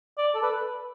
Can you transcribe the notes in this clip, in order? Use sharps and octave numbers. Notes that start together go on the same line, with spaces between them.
D5
A4
B4